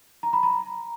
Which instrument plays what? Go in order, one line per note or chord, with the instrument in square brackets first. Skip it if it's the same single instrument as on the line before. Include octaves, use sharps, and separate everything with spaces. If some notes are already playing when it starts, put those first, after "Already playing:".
[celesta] A#5
B5
A#5